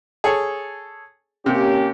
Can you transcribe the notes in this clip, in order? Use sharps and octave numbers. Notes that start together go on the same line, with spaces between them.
G#4 A4 C#5
C3 A#3 C#4 G4